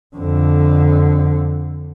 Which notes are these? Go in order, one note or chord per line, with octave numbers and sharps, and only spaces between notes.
F2 D3